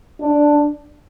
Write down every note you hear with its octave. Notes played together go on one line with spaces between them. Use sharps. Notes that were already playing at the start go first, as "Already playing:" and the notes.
D4